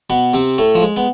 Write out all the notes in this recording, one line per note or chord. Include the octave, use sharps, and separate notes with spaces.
B2 B3
C3 C4
A2 A3
F3
G#3
B3